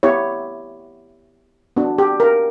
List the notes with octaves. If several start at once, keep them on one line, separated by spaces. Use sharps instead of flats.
B3 E4 G4 C#5
B3 D4 F#4
G4
A#4